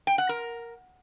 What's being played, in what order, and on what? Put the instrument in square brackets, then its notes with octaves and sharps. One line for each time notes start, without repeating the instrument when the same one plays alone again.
[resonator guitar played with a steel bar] G5
F#5
A#4